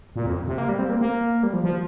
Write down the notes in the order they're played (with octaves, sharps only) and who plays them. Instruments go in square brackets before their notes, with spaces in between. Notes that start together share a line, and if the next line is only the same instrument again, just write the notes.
[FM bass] A#2
F2
C3
A#3
G3
C4
A#3
A#3
G3
F3
F3